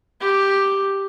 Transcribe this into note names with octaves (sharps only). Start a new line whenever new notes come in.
G4